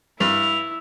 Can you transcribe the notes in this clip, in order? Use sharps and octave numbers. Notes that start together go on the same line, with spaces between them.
G2 E4 F7